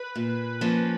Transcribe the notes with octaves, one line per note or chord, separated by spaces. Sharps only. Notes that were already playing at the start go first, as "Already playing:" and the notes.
Already playing: B4
A#2
F3 A#3 C#4